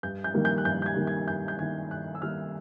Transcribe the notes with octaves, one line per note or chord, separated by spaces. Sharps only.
G2 G6
G6
D#3 G3 A#3
G6
F#6
G2 G6
G6
G#6
D#3 G3 A#3
G#6
G2 G6
G6
D#3 G3 A#3 G#6
G2 F#6
E6
D#3 G3 A#3 F6